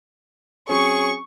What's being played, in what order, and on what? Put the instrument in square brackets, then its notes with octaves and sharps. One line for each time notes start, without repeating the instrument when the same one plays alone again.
[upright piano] F#3 C4 C#4 [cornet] G#4 [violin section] C#6